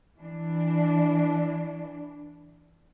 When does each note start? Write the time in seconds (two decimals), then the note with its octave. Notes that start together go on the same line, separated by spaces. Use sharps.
0.18 E3 D4